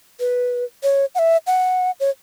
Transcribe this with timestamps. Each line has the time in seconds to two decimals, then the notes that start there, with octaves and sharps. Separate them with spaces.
0.20 B4
0.83 C#5
1.15 F#5
1.19 E5
1.47 F#5
2.00 C#5